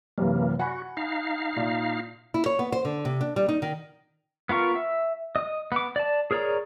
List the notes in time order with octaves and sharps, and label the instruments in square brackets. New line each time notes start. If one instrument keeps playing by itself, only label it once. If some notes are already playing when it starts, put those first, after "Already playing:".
[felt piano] F#2 C3 [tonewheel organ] E3 A#3
[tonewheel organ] F#4 [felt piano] F#5 G#5 B5
[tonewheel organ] D#4 F5
[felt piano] A#2 F4 E5
[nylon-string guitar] E4
C#5
B3
C5
D3
C3
D4
G3
D#4
D#3
[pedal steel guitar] B3 F4 A#4 C#6
E5
D#5 D#6
B3 D6
D5 A5
G#4 A#4 C#5 D5 A#5